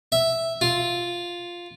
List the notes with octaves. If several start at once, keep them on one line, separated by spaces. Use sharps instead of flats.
E5
F4